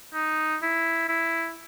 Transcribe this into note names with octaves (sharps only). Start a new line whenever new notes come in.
D#4
E4
E4